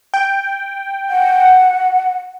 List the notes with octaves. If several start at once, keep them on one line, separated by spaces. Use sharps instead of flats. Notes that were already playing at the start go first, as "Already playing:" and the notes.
G5
F#5